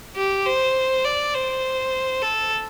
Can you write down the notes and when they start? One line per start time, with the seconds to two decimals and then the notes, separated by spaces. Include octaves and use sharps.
0.17 G4
0.46 C5
1.05 D5
1.34 C5
2.22 A4